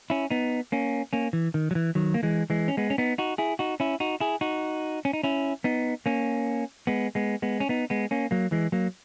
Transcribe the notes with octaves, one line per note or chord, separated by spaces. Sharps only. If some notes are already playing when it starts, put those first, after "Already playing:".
C#4 E4
B3 D#4
A#3 C#4
A#3 C#4
E3
D#3
F#3
E3
D#3 F#3
A#3
E3 G#3
E3 G#3
C#4
G#3 B3
C#4
B3 D#4
D#4 F#4
E4 G#4
D#4 F#4
C#4 E4
D#4 F#4
E4 G#4
D#4 F#4
C#4
D#4
C#4 E4
B3 D#4
A#3 C#4
G#3 B3
G#3 B3
G#3 B3
C#4
B3 D#4
G#3 B3
A#3 C#4
F#3 A#3
E3 G#3
F#3 A#3